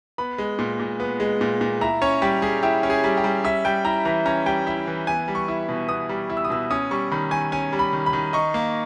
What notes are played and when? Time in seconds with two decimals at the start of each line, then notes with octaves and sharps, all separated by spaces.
0.18 B3 B5
0.38 G#3
0.59 A#2
0.80 A#2
1.00 B3
1.20 G#3
1.41 A#2
1.61 A#2
1.81 E4 A#5
2.02 C#4 C#5
2.22 G3 G4
2.42 G3 G#4
2.63 E4 G4
2.83 C#4
2.90 G#4
3.04 G3
3.17 G4
3.24 G3
3.44 C#4 E5
3.65 G3 G5
3.85 E4 A#5
4.05 E3 A#5
4.26 C#4 A#5
4.46 G3 G5
4.67 E4 E5
4.87 E3
5.07 B3 G#5
5.28 G3
5.35 C#6
5.48 E4
5.69 B2
5.89 B3 D#6
6.09 G3
6.30 E4
6.37 E6
6.44 D#6
6.50 B2 E6
6.71 C#4 D#6
6.91 G3 C#6
7.11 D#3 B5
7.31 D#3 G#5
7.52 C#4 G#5
7.73 G3
7.79 B5
7.93 D#3
8.06 B5
8.13 D#3
8.33 D#4 C#6
8.54 A#3